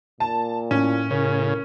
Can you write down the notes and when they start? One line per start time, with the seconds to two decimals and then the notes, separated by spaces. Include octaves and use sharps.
0.20 A#2 A5
0.71 A2 C#4
1.11 C#3 A#4